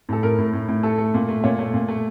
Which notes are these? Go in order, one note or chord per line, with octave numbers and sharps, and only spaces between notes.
A2 A4
A2 A#4
A2
A2
A2
A3 A4
A3
A#2
A3
A#2 C#5
A3
A#2
A3